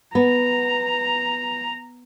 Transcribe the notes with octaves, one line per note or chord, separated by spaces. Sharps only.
B3 A#5